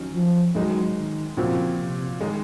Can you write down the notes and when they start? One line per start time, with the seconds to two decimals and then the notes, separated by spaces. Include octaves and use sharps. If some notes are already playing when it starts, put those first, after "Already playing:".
Already playing: D#3 F#3 C#4
0.14 F3
0.55 G#2 D#3 F#3 G#3 D#4
0.97 D#3
1.37 A#2 C#3 F3 C4 F#4
1.78 C3
2.21 D#3 G#3 D#4